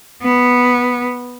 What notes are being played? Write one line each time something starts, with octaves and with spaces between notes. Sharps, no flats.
B3